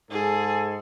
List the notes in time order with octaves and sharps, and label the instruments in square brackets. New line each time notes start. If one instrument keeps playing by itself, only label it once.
[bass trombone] G#2 [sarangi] G#4 [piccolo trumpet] A4